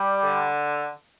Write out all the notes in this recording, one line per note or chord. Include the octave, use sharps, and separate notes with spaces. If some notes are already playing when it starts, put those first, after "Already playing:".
Already playing: G3
D3